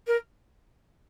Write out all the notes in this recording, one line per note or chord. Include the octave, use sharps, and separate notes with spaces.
A#4